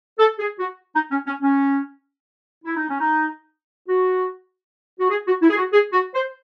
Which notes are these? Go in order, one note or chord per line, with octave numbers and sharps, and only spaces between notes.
A4
G#4
F#4
D#4
C#4
C#4
C#4
E4
D#4
C#4
D#4
F#4
F#4
G#4
F#4
E4
G#4
F#4
G#4
F#4
C5